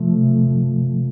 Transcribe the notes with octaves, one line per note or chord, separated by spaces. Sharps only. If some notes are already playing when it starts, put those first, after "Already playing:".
Already playing: C3 F3 A3